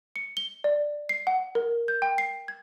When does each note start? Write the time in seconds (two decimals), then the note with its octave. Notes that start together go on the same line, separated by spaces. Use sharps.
0.16 C#7
0.37 G7
0.64 D5
1.09 C7
1.27 F#5
1.55 A#4
1.88 G6
2.02 G5
2.18 C7
2.48 G#6